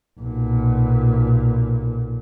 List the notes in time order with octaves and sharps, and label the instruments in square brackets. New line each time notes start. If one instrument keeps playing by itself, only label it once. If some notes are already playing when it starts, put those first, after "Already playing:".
[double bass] B1 A#2